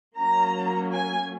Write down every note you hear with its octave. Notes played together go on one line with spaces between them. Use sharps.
F#3 A#3 C#4 A#5
G#5